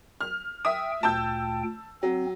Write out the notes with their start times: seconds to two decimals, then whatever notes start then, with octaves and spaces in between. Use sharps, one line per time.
0.21 F6
0.65 E5 G5 D#6
1.03 D2 A#2 G5 A5 E6 G6
2.03 F#3 C4